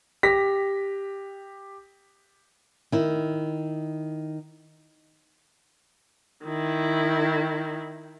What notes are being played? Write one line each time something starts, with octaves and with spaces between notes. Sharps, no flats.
G4 A#6 B6
D#3 E4
D#3 E4